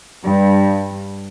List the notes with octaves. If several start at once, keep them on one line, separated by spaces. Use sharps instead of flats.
G2